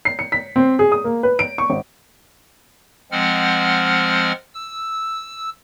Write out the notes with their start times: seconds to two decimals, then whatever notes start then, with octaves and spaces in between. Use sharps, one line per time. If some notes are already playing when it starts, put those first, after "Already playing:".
0.05 C7
0.19 C#7
0.32 B6
0.56 C4
0.79 G#4
0.92 D#6
1.04 A#3
1.23 B4
1.39 D7
1.58 C#6
1.70 G#1
3.12 F3 G#3 C4 F#5 F6
4.54 E6